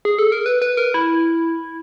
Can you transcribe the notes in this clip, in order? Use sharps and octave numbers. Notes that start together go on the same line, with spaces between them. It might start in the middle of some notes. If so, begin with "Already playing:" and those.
G#4
A4
A#4
B4
B4
A#4
E4